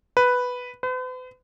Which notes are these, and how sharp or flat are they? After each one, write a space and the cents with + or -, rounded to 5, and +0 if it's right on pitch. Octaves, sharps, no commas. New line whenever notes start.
B4 +0
B4 +45